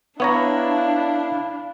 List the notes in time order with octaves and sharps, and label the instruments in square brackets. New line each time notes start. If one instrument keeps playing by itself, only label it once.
[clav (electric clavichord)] B3 C#5 A#5 [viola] D4 [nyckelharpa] E4 [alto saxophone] F5